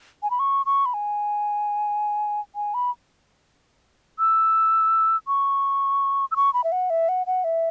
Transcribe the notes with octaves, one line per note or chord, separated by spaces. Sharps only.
G#5
B5
C#6
C#6
B5
G#5
G#5
B5
E6
C#6
E6
C#6
B5
E5
F#5
E5
F#5
F#5
E5